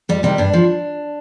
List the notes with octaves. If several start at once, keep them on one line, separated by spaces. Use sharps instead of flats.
F2 G3
C3 D#3 G3
G2 D4
F3